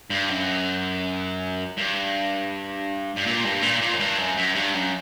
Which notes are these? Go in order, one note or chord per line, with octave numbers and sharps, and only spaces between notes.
G2
F#2
G2
G2
A#2
G2
A#2
A#2
F#2
G2
F#2
F#2
G2
F#2